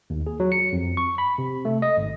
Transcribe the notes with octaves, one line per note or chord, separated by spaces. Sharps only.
D#2
G#4
F#3
C#7
F2
C#6
B5
C3
A3
D#5
G#1